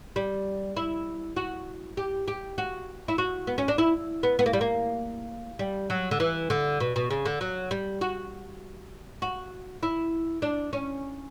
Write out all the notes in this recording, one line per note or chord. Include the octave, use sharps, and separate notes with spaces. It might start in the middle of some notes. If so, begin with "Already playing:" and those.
G3
E4
F#4
G4
G4
F#4
E4
F#4
B3
C#4
D4
E4
B3
B3
A#3
G3
A#3
G3
F#3
D3
E3
D3
B2
B2
C#3
D3
F#3
G3
F#4
F#4
E4
D4
C#4